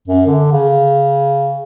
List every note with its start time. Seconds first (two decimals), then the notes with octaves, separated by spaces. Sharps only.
0.08 F#2
0.26 D3
0.52 C#3